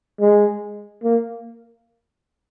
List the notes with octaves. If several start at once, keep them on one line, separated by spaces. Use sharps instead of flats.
G#3
A#3